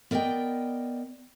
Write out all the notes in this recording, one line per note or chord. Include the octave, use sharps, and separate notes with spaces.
B3 A#4 D5 D#5 G5